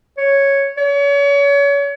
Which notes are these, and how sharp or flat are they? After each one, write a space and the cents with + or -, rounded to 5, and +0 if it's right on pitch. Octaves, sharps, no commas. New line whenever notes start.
C#5 +0
C#5 +35